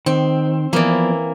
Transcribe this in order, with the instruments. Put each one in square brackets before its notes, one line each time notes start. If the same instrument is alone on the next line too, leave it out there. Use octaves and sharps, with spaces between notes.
[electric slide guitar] D#3 [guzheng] C4
[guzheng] E3 A#3 [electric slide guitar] F3 B3 D5